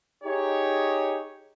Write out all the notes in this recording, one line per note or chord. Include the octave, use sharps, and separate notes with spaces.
D#4 G4 G#4 C#5